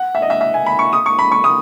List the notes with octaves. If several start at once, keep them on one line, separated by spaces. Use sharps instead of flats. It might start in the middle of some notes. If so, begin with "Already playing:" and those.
Already playing: F#5
E5
D#5
E5
E5
G#5
B5
C#6
D#6
C#6
B5
C#6
D#6